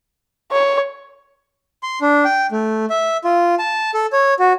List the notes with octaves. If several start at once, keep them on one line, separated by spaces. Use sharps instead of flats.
C#5
C6
D4
G5
A3
E5
F4
A5
A4
C#5
F#4